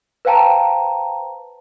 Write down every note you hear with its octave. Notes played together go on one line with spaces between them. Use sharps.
B4 C5 F5 G5 A5 A#5